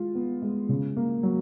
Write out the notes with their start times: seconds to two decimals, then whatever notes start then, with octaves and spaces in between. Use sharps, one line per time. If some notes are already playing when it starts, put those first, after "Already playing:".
Already playing: G#3 F4
0.15 B3
0.42 G#3
0.69 C#3
0.97 A#3
1.23 F#3